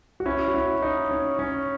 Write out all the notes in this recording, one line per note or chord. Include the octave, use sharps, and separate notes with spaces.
F#4
C#4 E4
F#4
C#4 E4
D#4
C#4
C#4